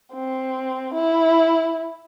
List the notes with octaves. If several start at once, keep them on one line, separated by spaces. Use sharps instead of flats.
C4
E4